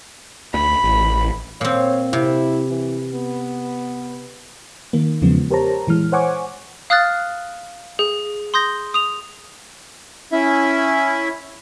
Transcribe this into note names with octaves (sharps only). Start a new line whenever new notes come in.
D2 B5
A1
A#2 C4 C#5
C3 E4
E3
B3
D#3 A#3
E2 C#3 F3 G#3 B3
G4 A#4 C5 C#5 A5 A#5
A#2 E3 G#3 F6
C5 C#5 F#5 G#5 C#6 D6
F5 D#6 F6 F#6 A6
G#4
C6 D#6 G6 A#6
D#6 F7
C#4 E4 E5